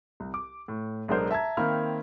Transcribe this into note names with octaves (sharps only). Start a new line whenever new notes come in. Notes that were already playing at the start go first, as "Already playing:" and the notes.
C2
D6
A2
B1 G#3 B3 D4 A#4 C5
E5 A5 A#5 G#6
D#3 A#3 C4 E5 B5 F6